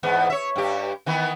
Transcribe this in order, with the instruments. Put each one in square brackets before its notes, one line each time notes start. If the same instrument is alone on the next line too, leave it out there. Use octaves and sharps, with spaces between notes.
[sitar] E2 G#2 B3
C#5 E5
G2 G4
D#3 E3 B3